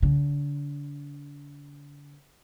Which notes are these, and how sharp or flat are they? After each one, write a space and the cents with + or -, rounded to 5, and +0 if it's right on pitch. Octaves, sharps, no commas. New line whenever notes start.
D3 -35